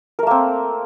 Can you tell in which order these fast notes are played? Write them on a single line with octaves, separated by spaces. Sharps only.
A#4 A3 A#3 C4